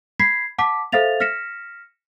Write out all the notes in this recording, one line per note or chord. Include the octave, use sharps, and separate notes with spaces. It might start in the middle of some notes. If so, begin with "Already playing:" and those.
B5 G#6 B6 C7
F#5 A5 D6 B6
A4 C5 E5 F5 A6 F7
F6 A#6 B6 C#7 E7